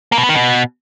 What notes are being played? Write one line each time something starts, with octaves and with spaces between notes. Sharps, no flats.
A#3
B2
B3
D#3
B2